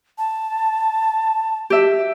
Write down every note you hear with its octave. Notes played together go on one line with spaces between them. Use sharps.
A5
G4 E5